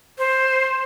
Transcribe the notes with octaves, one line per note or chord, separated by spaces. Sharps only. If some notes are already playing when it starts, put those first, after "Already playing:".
C5